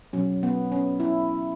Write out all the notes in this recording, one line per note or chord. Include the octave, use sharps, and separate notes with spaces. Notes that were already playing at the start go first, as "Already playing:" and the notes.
B2 F#3 C#4
B3
C#4
E4